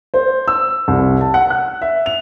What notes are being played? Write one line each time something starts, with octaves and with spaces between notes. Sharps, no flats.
C5
E6
C2
A5
F#5
F#6
E5
F7